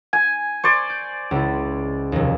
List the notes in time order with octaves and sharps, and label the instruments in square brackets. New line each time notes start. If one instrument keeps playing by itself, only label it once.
[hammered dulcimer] G#5
[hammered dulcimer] C5 D5 [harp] C#6 C#7
[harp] G6
C#2 E4
F1 D#2